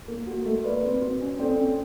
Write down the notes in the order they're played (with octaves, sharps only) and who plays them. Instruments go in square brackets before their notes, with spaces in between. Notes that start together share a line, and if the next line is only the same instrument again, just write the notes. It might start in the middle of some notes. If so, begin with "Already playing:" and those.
[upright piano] A#3
[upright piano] A#3 [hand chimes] F#4
[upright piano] A3
[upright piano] A#3 [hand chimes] B4 D5
[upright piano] C4
[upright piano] C4 [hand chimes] F#4
[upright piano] C#4
[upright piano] C4 [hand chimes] A4 D5 G5
[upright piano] C4
C#4